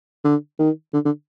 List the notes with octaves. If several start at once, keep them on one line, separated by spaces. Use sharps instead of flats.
D3
D#3
D3
D3